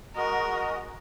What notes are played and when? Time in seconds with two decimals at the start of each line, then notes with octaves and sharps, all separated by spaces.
0.16 G#3 F#4 A#4 D#5